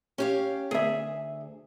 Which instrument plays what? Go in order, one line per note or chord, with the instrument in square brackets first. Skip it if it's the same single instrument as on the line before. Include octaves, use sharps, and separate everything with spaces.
[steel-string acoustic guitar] C#4 G4 F5
[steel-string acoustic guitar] D2 [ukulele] G#4 E5